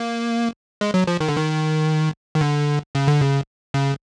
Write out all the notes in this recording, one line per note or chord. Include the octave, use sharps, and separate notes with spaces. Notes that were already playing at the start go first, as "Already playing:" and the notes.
Already playing: A#3
G#3
F#3
F3
D#3
D3
D#3
D#3
D3
C#3
D3
C#3
C#3